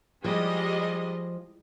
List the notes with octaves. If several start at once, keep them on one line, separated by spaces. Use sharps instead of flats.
F3 G3 G#3 D#5